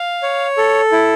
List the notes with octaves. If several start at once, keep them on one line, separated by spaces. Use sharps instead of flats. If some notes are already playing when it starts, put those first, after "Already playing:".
Already playing: F5
C#5
A4
E4